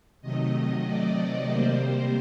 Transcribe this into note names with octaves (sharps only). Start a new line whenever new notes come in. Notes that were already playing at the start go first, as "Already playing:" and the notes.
C3 D#3 F#3 A3 D#5
D5
C3 G3 A#3 C5